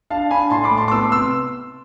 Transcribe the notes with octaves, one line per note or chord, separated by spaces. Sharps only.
D4 F5 A5
D4 G#5 B5
A2 A5 C6
B5 D6
A3
A5 C6
D6
B3 C6 E6
C3 C6 E6